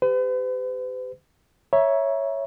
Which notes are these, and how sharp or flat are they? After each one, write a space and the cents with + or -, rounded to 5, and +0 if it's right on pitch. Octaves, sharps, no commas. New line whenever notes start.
G4 +15 B4 +45
C#5 +0 E5 +0 A#5 +30